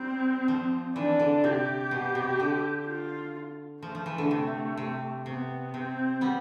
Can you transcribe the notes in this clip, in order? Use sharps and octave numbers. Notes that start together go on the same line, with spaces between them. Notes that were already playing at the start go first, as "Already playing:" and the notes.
Already playing: G3 C4
F3
E3 D4
D3
C3 G4
B2
C3
D3
F4
F3 A3
F3
E3
D3
C3
C3
C3 B3
C3 C4
G3 B3